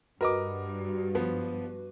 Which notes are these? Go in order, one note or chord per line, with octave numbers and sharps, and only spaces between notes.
G2 F#4 A#4 B4 D#5 D6
F3 B3